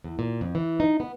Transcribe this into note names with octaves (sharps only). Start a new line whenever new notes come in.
E2
A#2
F2
E3
D#4
B3